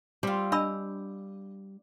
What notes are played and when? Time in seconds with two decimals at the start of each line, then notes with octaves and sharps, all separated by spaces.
0.23 G3 C4 F4
0.52 D4 D#5 B5 E6